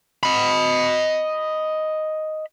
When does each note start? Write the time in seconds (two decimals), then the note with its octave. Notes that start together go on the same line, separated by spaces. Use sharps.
0.23 D#5 B5